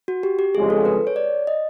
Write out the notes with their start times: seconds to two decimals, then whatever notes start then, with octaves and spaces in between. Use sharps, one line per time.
0.08 F#4
0.23 G4
0.39 G4
0.54 G1 F2 C#3 F3 G#3 G#4
0.70 A4
0.85 B4
1.07 C#5
1.16 D5
1.47 D#5